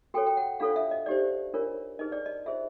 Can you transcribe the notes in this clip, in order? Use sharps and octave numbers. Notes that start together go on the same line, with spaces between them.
F#4 A4 C#5 G5
G5
F#5
D4 F4 A4 C#5 F5
E5
D#5
D#4 G4 C5 D5
D4 F4 A#4 C#5
D#4 G#4 B4 D#5
D5
D#5
F4 G#4 C5 E5